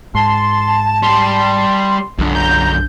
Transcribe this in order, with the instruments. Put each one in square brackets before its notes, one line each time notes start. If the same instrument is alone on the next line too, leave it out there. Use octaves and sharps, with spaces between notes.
[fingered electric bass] G#2 [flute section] A5 [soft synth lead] C6
[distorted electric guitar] G3 G4 [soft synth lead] C6
[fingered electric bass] B1 D#3 D4 [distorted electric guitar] F#2 D3
[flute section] A#5 [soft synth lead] G6